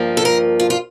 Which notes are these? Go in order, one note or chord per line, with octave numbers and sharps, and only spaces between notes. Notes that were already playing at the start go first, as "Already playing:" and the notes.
Already playing: G2 F3 A#3
A4
A#4
F4
F4